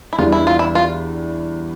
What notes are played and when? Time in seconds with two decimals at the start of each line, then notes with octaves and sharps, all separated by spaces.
0.13 E4
0.18 E2 E3 G3 D4 F4
0.32 E4
0.47 F4
0.59 E4
0.75 F4